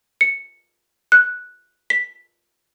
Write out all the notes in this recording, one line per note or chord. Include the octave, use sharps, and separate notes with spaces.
C#7
F#6
B6